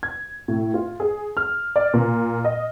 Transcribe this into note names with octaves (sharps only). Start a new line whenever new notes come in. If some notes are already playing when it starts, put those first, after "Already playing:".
G#6
A2
F4
G#4
F6
D5
A#2
D#5